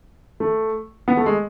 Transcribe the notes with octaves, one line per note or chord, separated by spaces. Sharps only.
A3
B3
A3
G#3